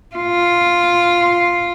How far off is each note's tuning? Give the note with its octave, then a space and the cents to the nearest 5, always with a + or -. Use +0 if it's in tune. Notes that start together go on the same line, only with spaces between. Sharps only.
F4 +0